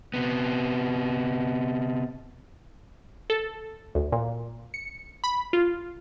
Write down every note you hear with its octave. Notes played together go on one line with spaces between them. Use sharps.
C3 B3
A4
D2
A#2
C#7
B5
F4